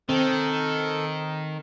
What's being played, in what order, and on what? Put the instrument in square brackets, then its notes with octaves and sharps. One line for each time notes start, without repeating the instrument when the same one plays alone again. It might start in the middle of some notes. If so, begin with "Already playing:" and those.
[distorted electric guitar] D#3 [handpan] C4 [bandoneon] A4